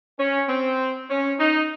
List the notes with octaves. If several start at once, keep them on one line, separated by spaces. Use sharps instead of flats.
C#4
C4
C#4
D#4